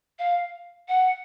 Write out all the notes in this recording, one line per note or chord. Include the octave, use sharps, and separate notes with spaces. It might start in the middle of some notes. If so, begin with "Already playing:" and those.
F5
F#5